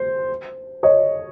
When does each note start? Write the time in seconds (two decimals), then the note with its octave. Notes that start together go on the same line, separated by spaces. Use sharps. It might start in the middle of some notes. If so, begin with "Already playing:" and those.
Already playing: C5
0.83 C#5 D#5